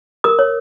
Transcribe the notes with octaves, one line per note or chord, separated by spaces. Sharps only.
A#4 D#6
C#5